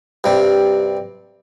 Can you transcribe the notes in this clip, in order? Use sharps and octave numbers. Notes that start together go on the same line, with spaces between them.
G2 C3